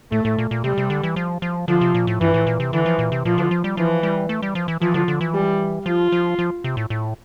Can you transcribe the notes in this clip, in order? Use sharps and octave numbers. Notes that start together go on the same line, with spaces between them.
A2 A3
A2
A#2
A#2
C3 G3
C3
D3
E3
F3
F3
D3 F3
C3
A#2
A2
G2 E3
A2
A#2
C3
D3 E3
F3
A#2
C3
A#2 F3
D3
F3
G3
E3 F3
G3
A3
G3
F3
E3
E3 F3
D3
D3
E3
G3
F3 F4
F3
F3
C3
A2
A2